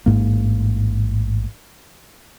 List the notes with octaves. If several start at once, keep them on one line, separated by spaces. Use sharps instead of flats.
A1 G#2 A#3